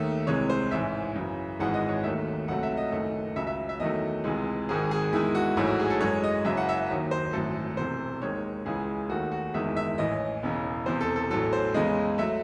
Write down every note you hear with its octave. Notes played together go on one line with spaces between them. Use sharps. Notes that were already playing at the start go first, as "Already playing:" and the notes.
Already playing: D#2 D#3 A3 E5
C2 C3 E3 G#3 C#5
C5
A1 G#2 E3 E5
F#2 C#3 E3
G#1 G#2 E3 G#3 F#5
D#5
C#5
D#2 D#3 F#3 A3 E5
C#2 C3 F#3 A3 F#5
E5
D#5
F#1 F#2 D#3 A3
C#2 C#3 F#3 E5
E5
E5
E2 D#3 F#3 A3 D#5
C#2 C3 E3 G#3
G#1 G#2 D#3 G#4
G#4
E2 D#3 G#3 E4
F#4
A1 G#2 F#3 A3 E4
F#4
G#4
A4
F#2 E3 G#3 C#5
D#5
F#1 F#2 C#3 E5
F#5
E5
D#2 D#3 F#3
C5
G#1 F#2 E3 A3 A4
E1 E2 C3 C5
D#2 D#3 G#3 C#5
C#2 C#3 E3 G#3 G#4
D#2 D#3 A3 F#4
F#4
F#1 E2 D#3 G#3 E5
E5
A1 A2 E3 D#5
E1 E2 C#3
E1 E2 C3 C5
A4
A4
A1 A2 F#3 A4
C5
E2 C#3 E3 G#3 D#5
F#3 A3 E5